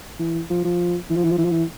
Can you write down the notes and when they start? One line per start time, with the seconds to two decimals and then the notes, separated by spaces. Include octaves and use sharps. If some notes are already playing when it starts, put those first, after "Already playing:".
0.19 E3
0.50 F3
0.65 F3
1.10 E3
1.16 F3
1.24 E3
1.31 F3
1.38 E3
1.44 F3
1.51 E3